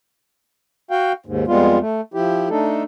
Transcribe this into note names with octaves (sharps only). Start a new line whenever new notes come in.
F#4 F5 G5
D#2 G#2
F2 G3 G#3 B3 F4
A3
F3 E4 G4
A3 D4 D#4 A4